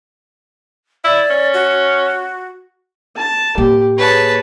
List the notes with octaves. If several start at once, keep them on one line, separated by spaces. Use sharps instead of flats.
E4 D5
C#4
F#4
A5
A2 A#3 G4
G#4 B4 C#5 A5